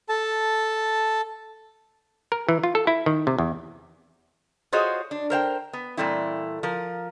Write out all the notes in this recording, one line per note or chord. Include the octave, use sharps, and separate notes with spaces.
A4 A5
A#4
E3
F4
A4
E4
D#3
C3
E2
F4 F#4 G#4 C5 C#5 D#5
D4
A#4 C5 F5 G5
B3
A#2 E3 G3 A3 C4 E4
F3 A#4